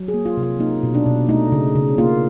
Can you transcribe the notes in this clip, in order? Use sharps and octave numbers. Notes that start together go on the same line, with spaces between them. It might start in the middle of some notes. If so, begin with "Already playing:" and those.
Already playing: F#3
G#4
A#3
F4
C3
F4
A#3 D#4
B2
D4
B2
A3 D#4
C#3
C#3
A#3 F4